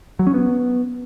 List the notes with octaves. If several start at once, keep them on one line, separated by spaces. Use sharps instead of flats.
F#3
C#4
B3